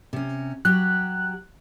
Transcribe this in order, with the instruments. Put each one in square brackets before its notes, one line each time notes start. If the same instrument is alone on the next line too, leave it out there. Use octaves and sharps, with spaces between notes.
[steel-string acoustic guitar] C3 C#4
[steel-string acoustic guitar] F#3 G4 [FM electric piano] F#6